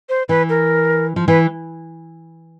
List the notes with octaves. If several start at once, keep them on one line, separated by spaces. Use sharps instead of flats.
C5
E3 B4
A#4
F3
E3 B4